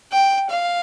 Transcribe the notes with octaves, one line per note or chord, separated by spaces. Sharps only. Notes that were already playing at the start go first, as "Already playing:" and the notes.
G5
F5